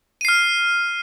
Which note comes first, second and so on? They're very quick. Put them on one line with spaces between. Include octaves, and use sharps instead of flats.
D#7 C7 F6